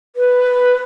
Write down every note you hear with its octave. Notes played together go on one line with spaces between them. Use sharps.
B4